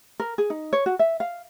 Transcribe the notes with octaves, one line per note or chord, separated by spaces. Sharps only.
A#4
G#4
D#4
C#5
F#4
E5
F5